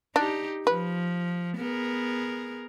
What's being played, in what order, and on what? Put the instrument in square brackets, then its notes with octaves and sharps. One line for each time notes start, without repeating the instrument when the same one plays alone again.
[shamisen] D4 [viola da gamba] D#4 G4
[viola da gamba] F3 [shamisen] B4
[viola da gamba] B3 G#4 A#4